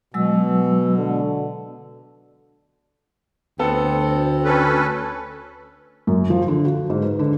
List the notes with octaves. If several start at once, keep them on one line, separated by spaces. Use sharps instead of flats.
B2 F#3 G#3 B3 E6
D3
D2 B3 C4 A4
C#4 A4 B4
F#2
F3
D3
F#4
G#2
B4
D3